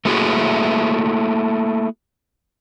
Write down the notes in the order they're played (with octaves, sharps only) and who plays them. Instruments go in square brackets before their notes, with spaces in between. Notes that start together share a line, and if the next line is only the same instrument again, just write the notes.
[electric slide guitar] A3 A#3 E4 F#4 G#4